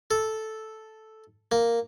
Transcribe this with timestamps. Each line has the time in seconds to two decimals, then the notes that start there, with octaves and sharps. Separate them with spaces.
0.11 A4
1.52 A#3